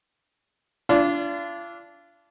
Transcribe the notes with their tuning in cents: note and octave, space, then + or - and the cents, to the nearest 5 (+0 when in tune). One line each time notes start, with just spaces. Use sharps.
D4 -20 F4 -35